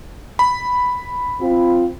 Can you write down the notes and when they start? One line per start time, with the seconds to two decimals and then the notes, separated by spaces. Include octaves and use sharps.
0.39 B5
1.40 C4 F4